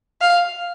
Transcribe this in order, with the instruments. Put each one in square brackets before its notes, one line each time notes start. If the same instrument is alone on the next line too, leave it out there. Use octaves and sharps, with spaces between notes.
[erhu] F5